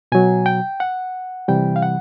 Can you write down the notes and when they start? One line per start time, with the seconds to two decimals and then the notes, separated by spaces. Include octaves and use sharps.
0.12 B2 F#3 G#5
0.46 G5
0.80 F#5
1.48 C3 E3 G3 G5
1.76 F5
1.82 F#5